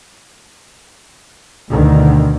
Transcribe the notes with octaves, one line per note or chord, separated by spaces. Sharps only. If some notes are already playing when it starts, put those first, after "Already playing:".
D2 B2 D3 D#3